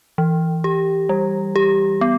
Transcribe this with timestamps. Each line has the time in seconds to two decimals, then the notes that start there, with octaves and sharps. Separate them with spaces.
0.18 E3
0.64 G4
1.09 G3
1.56 G4
2.01 B3